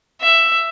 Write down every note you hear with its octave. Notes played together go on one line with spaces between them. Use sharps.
E5